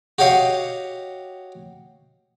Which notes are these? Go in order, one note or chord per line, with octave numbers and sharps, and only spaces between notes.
F#4 G4 C#5 D#5 F5